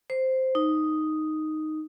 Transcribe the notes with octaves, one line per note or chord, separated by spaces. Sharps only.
C5
D#4